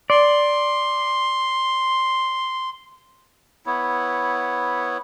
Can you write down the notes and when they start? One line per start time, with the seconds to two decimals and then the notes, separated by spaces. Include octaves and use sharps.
0.10 D5 C6
3.66 B3 E4 C#5